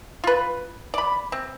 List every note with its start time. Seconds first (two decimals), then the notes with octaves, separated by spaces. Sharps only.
0.24 F4 B4
0.94 D5 B5
1.32 C4